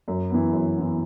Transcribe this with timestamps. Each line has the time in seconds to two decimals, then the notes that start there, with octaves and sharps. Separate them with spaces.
0.08 F#2
0.30 E3 B3
0.53 F#2
0.76 E3 B3